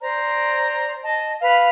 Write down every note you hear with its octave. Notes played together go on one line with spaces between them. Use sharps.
C5 D5 A#5
D#5 A5
B4 F5